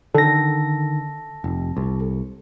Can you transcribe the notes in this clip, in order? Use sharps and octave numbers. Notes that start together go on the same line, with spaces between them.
D3 D#3 A4 A#6
F1
C2